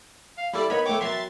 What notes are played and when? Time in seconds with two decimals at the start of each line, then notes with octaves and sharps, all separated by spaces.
0.38 F5
0.54 G3 E4 A4 D5 B5
0.70 B3 D#4 B4 C#5 D#5 B5
0.86 A3 C#5 G5 D6
1.01 F#3 E5 A#5 C6 A6